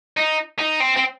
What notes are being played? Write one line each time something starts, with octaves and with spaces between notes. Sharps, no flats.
D#4
D#4
C4
C4